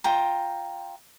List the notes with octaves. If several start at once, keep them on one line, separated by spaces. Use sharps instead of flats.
F4 G5 A#5